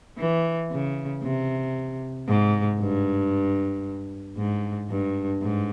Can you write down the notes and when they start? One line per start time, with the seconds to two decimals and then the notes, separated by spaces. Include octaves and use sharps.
0.18 E3
0.71 C#3
1.23 C3
2.28 G#2
2.80 G2
4.37 G#2
4.90 G2
5.42 G#2